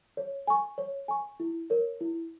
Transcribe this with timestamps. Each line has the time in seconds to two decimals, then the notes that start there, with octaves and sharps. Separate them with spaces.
0.17 C#5
0.47 G#5 C#6
0.78 C#5
1.08 G#5 C#6
1.40 E4
1.70 A#4 C#5
2.01 E4